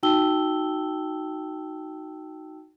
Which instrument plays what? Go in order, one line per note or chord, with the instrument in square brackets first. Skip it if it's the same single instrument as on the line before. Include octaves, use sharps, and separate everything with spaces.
[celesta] D#4 F#4 G5 A5 E6 G7